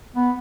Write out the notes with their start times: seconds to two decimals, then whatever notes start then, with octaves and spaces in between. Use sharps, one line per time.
0.15 B3